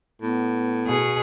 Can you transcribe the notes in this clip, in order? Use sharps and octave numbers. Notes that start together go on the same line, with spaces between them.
A2 B3
B2 G#4